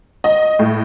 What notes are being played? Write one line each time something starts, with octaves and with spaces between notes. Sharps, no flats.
D#5
A2